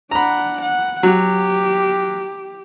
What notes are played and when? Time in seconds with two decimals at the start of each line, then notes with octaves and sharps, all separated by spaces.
0.11 D4 F#5 A#5 B5
0.62 F#5
1.03 F#3 G4